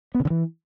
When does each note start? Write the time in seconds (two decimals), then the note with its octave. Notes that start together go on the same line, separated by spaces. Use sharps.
0.15 B3
0.20 C#3
0.25 D3
0.30 E3